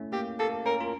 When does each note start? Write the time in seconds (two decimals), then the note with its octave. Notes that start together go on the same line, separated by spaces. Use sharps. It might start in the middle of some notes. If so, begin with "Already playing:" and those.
Already playing: A3 C#4 E4
0.13 A#3 G4
0.39 A#3 A4
0.66 C#4 A#4
0.81 F4